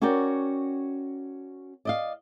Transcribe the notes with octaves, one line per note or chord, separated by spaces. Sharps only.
C#4 F#4 A#4 D5 G5
D5 D#5 F5